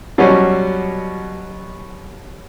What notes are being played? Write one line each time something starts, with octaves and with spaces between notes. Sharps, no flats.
B2 F#3 G3 C#4